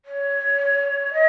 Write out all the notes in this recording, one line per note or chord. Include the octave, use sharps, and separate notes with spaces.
C#5
D#5